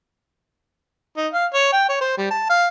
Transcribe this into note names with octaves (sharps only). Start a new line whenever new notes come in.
D#4
F5
C#5
G5
C#5
C5
G3
A5
F5